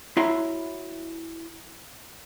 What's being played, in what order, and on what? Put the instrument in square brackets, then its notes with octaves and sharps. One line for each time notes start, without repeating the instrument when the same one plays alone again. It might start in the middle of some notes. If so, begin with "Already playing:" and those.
[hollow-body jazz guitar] E4 F#4 C#5 E5 A#5 C6